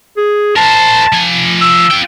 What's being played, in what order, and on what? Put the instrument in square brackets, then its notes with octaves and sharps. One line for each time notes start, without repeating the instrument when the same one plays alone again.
[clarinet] G#4
[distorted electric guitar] A#4 C5 [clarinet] A5
[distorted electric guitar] F3 G#5
[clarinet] E6
[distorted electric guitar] F4 G5